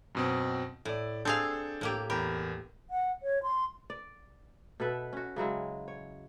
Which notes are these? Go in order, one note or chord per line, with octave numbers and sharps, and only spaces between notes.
F#2 B2 C4
A2 E4 D5
C4 D4 G#4 A4 F5 G6
A2 A#3 G4
E2 G4 A#4 B5
F#5
C#5
C6
D5
B2 A4 B4 E5
C#4 F#4
C#3 F#3 G#3 E4
C#5